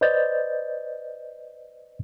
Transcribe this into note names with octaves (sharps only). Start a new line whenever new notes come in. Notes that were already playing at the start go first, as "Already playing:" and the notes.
B4 C5 D5 D#5 G6 A6